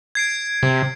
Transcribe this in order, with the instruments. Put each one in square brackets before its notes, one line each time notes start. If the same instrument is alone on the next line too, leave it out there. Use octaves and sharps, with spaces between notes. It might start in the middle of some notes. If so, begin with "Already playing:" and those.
[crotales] G#6 C7 D7
[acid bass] C3